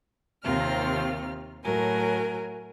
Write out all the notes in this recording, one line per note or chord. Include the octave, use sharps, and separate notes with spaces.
D#2 C3 D#3 C4 F4 F6
A2 F#3 A#4 G#5